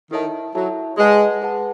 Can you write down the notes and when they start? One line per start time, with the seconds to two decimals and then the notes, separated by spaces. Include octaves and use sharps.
0.11 D#3 E4 A4 C#5 E5 A5
0.55 F#3 E4 A4 C#5 E5 A5
0.98 G#3 G#4 B4 F#5 A5
1.42 G#4 B4 F#5 A5